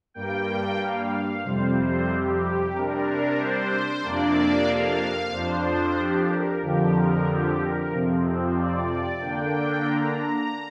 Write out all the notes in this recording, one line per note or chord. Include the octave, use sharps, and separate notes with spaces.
G2 G3 A#3 G5
F5
F2 C3 G3 C4 C5
G4
C3 G3 D4 A#4
C5
F2 C3 A#3 D4 D5
F5
F2 F3 D4 C5
G4
A#4
F2 D3 F3 G4
A#4
G4
A#4
F2 C3 F3 C4
D5
D3 A#3 D4 G5
A#5
A#5